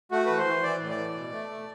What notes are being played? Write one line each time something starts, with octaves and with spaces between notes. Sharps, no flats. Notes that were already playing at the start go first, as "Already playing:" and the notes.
A3 F#4
E3 B4
C5
E3
E3 D5
A2
D5
E3
B2
A3
A3